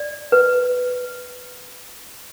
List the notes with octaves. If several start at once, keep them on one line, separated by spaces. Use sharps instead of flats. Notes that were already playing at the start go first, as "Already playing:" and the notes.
Already playing: D5
B4